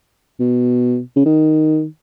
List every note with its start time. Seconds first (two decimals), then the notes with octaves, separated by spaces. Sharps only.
0.40 B2
1.16 C#3
1.25 D#3